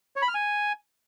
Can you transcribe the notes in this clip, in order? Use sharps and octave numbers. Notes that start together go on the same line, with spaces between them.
C#5
B5
F6
G#5